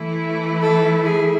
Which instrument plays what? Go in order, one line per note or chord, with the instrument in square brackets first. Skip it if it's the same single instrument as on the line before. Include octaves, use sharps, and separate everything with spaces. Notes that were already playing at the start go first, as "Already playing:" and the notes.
Already playing: [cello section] E3 A3 E4
[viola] A4
G#4